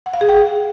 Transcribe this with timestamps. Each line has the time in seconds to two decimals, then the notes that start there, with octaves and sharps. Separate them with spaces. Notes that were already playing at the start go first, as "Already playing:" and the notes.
0.06 F#5
0.14 F5
0.21 G#4
0.29 G5